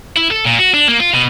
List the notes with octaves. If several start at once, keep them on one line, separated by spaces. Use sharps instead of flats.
E4
A4
A#2
F#4
D4
A#3
F4
B2